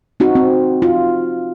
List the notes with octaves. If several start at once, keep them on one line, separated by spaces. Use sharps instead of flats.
C4 D#4 F#4
C4
F4